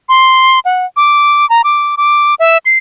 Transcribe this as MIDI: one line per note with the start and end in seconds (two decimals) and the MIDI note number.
0.09 0.59 84
0.65 0.86 78
0.97 1.48 86
1.50 1.62 82
1.64 1.95 86
1.97 2.35 86
2.39 2.57 76
2.66 2.78 96